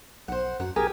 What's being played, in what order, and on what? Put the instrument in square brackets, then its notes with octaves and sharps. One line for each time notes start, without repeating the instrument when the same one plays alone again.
[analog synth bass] B1 [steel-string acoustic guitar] C5 F#5
[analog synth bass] F#2 [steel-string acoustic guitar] F#3 F#5
[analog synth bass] B1 [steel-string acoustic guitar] G4 [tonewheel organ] G#4 A#4 G#5